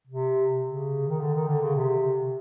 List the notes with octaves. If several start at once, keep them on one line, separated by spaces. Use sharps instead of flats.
C3
C#3
D#3
D3
D#3
D3
C#3
C3